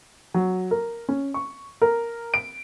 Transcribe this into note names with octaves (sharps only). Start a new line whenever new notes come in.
F#3
A#4
C#4
C#6
A#4
D7